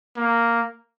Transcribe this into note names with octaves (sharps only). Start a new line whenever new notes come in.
A#3